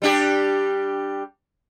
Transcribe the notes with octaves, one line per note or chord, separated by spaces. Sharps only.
G3 D4 G4